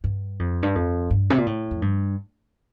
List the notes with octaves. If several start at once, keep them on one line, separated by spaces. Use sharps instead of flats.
G2
F2
G2
F2
G2
C3
A#2
A2
F2
G2